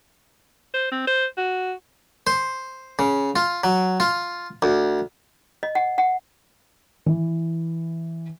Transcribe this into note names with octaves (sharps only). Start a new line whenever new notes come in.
C5
C4
C5
F#4
C5
C#3
F4
F#3
F4
D2
D#5
F#5
F#5
E3